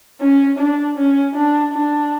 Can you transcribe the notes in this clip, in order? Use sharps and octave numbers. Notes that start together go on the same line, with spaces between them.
C#4
D4
C#4
D4
D4